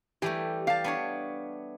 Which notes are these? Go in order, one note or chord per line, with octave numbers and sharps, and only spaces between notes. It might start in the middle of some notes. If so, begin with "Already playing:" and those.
E3 G3 A3 G4
G4 F5 A5
B3 D4 C#5